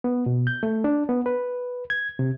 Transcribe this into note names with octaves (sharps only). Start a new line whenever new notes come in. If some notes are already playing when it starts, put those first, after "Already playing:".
B3
B2
G6
A3
D4
B3
B4
G#6
C3